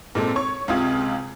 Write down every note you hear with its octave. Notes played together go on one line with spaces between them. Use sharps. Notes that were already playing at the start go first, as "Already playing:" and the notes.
A#2 G#3 C4 A4
C#5 C#6
C#2 C3 F4 D#6 G#6